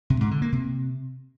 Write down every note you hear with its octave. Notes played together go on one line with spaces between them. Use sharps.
C3
G#2
D3
A#3
C3